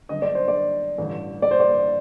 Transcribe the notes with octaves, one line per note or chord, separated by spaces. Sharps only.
G1 F#2 D3 D#5
D5
C5
D5
A1 G2 D3
D5
C5
D5